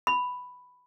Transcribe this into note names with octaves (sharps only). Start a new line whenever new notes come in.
B5